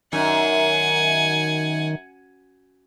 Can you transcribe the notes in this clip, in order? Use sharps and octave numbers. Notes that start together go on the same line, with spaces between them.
F#2 D#3 F#5 G#5